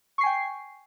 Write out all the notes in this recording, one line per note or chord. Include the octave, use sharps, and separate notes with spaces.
G5 G#5 C#6 C7